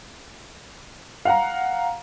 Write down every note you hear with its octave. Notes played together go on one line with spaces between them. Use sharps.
F5 F#5 A#5